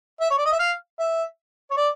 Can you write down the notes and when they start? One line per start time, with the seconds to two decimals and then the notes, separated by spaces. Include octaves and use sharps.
0.21 E5
0.31 C#5
0.38 D5
0.46 D#5
0.52 E5
0.60 F5
0.99 E5
1.71 C#5
1.77 D5